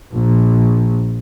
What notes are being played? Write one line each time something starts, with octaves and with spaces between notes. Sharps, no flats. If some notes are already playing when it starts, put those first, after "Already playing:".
A#1